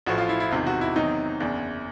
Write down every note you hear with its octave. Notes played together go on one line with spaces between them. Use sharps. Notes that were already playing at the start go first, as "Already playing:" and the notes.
A1 A2 F3 F#4
F4
E4
E4
E1 E2 C3 D#3 F4
F#4
E4
E2 C3 D#3 F#3 D#4
F#1 E2 C#3 D4